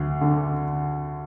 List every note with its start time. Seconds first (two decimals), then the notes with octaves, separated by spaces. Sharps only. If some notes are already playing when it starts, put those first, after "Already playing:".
Already playing: D2
0.21 D3